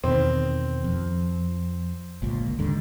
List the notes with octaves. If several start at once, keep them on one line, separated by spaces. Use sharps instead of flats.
E2 B2 D#3 C4
F2
G1 C#2 A#2
D#2 G#2 D3